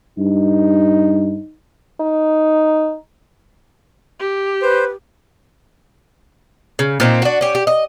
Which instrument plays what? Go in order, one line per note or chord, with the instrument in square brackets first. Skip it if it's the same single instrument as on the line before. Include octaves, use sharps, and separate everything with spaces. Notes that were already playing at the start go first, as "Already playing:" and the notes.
[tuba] G2 [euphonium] D#4
[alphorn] D#4
[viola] G4
[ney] B4 [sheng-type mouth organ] C5
[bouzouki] C#3
A#2 C4 D#4
D4 F#4
C#4 G4
G4
D#5